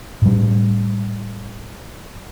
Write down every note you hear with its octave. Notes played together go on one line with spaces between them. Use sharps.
A2 G3